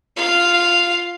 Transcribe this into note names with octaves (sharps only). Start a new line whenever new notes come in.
F4 F5